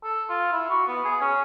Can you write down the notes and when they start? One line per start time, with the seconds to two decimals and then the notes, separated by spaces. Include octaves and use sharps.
0.04 A4
0.29 F4
0.52 E4
0.70 F#4
0.88 B3
1.05 G#4
1.21 C#4